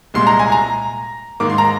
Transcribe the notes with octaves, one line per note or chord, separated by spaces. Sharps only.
C2 A#2 G#3 C6
A#5
G#5
A#5
G#2 D#3 A#3 D6
C6
A#5